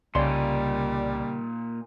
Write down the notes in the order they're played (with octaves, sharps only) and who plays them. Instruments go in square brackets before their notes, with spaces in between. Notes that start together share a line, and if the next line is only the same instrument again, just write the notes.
[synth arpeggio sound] C2 D5 [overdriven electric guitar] A#2 D#4 [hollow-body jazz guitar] C#3 C6 [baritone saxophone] G3